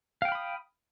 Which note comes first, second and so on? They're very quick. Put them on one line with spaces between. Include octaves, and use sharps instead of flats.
F5 G5 F6 B5 D#6